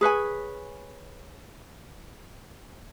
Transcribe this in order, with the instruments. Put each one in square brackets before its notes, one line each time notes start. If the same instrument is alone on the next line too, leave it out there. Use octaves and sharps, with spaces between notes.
[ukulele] G#4 B4 C#5 G#5